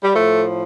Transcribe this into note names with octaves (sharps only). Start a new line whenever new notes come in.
G3
A2 F3 A3